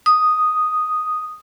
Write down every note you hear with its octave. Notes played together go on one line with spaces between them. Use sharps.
D#6